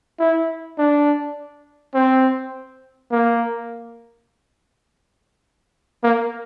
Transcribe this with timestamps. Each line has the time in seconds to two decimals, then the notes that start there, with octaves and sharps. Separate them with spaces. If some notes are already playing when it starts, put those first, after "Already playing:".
0.19 E4
0.78 D4
1.94 C4
3.12 A#3
6.03 A#3